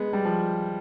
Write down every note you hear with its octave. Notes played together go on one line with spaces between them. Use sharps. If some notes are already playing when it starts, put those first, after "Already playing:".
Already playing: G#3 B3
G3
F3